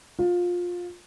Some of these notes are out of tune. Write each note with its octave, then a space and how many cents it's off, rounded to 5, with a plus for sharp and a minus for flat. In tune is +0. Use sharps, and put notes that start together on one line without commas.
F4 +20